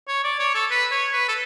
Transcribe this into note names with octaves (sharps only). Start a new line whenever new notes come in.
C#5
D5
C#5
A4
B4
C#5
B4
A4